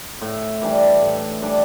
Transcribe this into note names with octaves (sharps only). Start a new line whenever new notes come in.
A2
E3 G3 D4
A2
E3 G3 D4